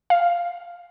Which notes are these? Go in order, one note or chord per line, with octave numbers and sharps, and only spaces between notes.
F5